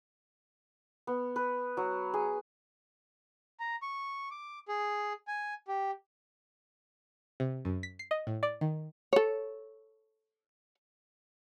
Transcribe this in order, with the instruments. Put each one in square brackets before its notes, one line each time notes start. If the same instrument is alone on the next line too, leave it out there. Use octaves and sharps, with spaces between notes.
[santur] B3
B4
F#3
G#4
[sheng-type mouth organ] A#5
C#6
D6
G#4
G#5
G4
[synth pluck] C3
F#2
B6
C7
D#5
A2
D5
D#3
[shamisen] A4 C#5